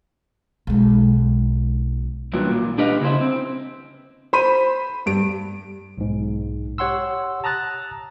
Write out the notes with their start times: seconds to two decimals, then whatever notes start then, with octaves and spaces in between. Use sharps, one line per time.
0.67 B1 G#3
2.33 G2 A#2 E3 F#3
2.51 A#2
2.78 D4 G4 B4 D#5 F5
3.01 C#3 E4 C5
3.21 C4
4.33 C5 B5 D#7
5.06 G2 D7
5.98 B1 G#2
6.78 G4 C#5 F#5 C6 E6
7.44 A5 A#5 D#6 F#6 A6